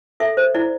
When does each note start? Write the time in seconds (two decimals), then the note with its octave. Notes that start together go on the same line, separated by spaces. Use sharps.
0.20 A4 E5
0.37 C5
0.55 E4 D5